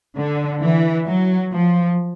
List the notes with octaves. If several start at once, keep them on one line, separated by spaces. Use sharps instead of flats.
D3
E3
F#3
F3